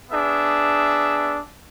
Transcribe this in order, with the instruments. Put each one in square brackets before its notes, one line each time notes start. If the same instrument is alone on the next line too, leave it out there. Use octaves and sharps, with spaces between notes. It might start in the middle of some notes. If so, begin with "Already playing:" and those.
[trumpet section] B3 D4 G#4 E5